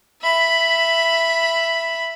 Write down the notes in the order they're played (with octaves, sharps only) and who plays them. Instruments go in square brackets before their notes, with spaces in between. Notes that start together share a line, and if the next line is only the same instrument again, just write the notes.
[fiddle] E5 B5